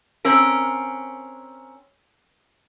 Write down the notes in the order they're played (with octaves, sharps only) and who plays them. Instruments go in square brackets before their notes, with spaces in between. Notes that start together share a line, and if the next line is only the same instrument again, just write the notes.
[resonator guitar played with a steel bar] C4 C#4 A#4